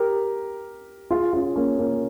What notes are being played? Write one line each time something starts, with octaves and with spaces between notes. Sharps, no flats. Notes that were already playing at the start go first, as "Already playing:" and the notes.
Already playing: G4 A#4
F4 G#4
C#4 F4
A#3 C#4
A#3 C#4